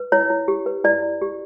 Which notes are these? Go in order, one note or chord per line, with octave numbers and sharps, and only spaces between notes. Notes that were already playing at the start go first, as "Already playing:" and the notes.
Already playing: B4
E4 C#5
E4
G4
B4
E4 D5
E4
G4